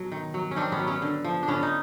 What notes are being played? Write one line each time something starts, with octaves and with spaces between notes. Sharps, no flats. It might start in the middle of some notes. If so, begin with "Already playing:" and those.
Already playing: B2 F#3 C#4
D#3
F#3
C#4
D#3 C4 D4
B3 C#4
F#3
B3 C#4
D3
F3
D4
D3 B3 C#4
D#4